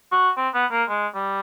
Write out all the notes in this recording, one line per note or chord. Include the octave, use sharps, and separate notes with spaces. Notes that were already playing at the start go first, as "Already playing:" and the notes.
F#4
C4
B3
A#3
G#3
G3